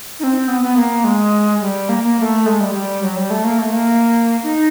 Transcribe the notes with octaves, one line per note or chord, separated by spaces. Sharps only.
D#4
C4
B3
B3
A#3
G#3
G3
A#3
A#3
A#3
A3
G#3
G3
G3
F#3
G3
A3
A#3
A3
A#3
D#4